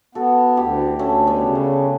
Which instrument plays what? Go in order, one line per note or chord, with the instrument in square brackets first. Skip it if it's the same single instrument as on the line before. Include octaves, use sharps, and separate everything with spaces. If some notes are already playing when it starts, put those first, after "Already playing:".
[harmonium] B3 [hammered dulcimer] F#4 A4
[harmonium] D2 [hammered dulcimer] E4 G4
[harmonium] D2 [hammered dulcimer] A3 C#4
[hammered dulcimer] G3 B3
[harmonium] C#3
[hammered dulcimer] A3